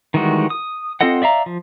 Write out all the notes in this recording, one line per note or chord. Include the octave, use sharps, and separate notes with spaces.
D#3 E3 G3 G#3 F#4
D#6
C4 F4 A4 D#5 F#5
D5 E5 F5 A#5
F3